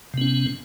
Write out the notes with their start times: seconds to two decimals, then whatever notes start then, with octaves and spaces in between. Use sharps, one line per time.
0.14 C3
0.18 B3
0.21 C#4